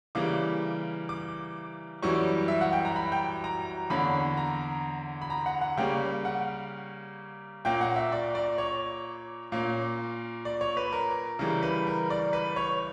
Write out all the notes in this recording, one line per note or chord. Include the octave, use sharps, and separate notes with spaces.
C#3 E3 G3 A#3 D6
D6
F#2 E3 G3 C#4 C#6
E5
F#5
G5
A#5
B5
G5
A#5
E2 D3 A#3 C#4 B5
A#5
B5
A#5
F#5
F#5
C#3 G3 A#3 C#4 G5
F#5
A#2 A#3 C#4 G5
F#5
E5
D5
D5
C#5
A#2 A#3 C#4
D5
C#5
B4
A#4
C#3 E3 G3 A#4
B4
A#4
D5
B4
C#5